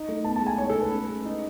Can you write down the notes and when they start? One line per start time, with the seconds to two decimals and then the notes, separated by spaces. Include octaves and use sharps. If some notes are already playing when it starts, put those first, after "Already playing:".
Already playing: D#4
0.08 A3
0.24 B3 A5
0.36 A5
0.41 G#3
0.47 G#5
0.58 D#4 C#5
0.70 A4
0.75 A3
0.81 B4
0.92 C#4
1.08 G#3
1.25 D#4